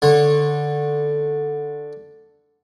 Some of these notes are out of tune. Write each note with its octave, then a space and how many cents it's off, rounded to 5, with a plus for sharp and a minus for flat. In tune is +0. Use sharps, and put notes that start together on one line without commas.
D3 +0 C#5 -25